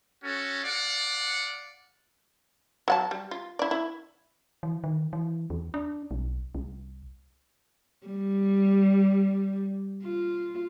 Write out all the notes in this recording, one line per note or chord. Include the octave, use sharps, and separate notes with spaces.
C#4 F#4 A4
D5 F5 F#5
F#3 F#5 A5
G3
F4
E4 D5
E4
E3
D#3
E3
E2
D4
B1
C2
G3
F4